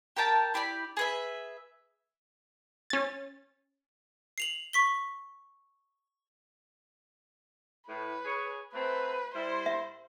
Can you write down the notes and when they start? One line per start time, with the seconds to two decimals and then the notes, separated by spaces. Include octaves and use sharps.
0.16 G4 A#4 G5 A5
0.54 E4 G4 D5 B5
0.97 G#4 B4 E5
2.90 C#4 A6
4.38 C7 F7 F#7
4.73 C#6 B6 G7
7.88 A2 B4
8.25 G#4 C#5
8.74 F#3 A3 C4 B4
9.34 G3 E4 C5
9.66 E5